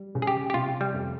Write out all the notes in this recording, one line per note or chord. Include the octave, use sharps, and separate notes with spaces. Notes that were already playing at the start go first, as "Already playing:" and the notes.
Already playing: G3
C#3
G#4
G4
G4
C3 F4
G3
F2